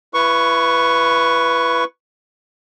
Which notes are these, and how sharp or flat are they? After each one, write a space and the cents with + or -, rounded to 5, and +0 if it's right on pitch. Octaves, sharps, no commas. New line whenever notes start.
E4 +30 B4 +0 C#6 +0